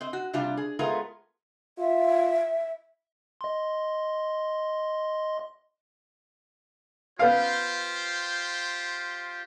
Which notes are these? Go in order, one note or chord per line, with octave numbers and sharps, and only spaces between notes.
C4 D#5
F#4
C3 G3 D4 F4 G4
G#4
G#3 A3 B3 F4 G#4 A#4
F4 E5
D#5 C6
B3 F4 G4 C5 F5